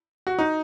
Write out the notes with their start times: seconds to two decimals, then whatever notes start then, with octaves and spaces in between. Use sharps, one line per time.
0.27 F#4
0.39 D#4